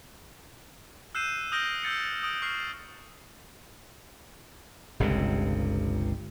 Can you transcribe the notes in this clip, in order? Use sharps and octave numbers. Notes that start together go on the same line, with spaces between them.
E6 F#6 G6 C7 D#7 E7
D#6 F6 G6 A#6 D7 G7
E6 G6 A6 C#7
D#6 D7
C#6 F6 C7
G1 C#2 G2 C3